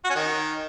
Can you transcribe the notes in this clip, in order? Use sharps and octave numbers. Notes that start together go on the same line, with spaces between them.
F#4
C#4
D#3